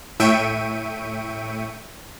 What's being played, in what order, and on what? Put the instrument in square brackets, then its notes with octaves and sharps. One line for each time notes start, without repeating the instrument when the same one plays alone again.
[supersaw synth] A2 E5 G5 C#6 D7 D#7